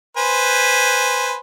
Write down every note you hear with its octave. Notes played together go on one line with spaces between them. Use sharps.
B4 C5 G#5